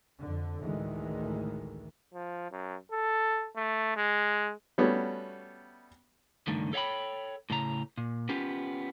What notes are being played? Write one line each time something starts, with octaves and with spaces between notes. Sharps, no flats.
F2 D3
A1 D2 A2 D#3 E3 G#3
F3
F#2
A4
A3
G#3
G3 A3 B3 C#4 F#4
C#2 G2 D3 D#3 A3
A4 C#5 F5 G5 B5
A2 C#3 A#5
A#2
B3 C#4 F4 G4